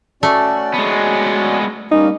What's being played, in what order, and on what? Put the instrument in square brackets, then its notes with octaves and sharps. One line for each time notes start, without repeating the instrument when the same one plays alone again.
[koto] A3 [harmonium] C#4 F#4 D5
[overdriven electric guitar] G#3 B3
[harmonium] G3 A#3 C#4 [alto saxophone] D#4